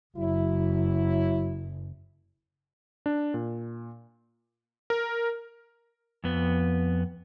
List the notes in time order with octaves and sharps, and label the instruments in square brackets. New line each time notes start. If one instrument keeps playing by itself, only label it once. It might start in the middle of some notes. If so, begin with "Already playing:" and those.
[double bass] F#1 [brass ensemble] F#3 E4
[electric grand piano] D4
A#2
A#4
[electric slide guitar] F2 B3